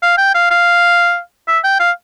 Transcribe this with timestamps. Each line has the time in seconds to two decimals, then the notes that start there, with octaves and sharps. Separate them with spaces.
0.03 F5
0.18 G5
0.35 F5
0.51 F5
1.48 E5
1.64 G5
1.80 F5